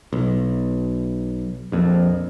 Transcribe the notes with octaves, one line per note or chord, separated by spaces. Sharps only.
B1
A#1 F2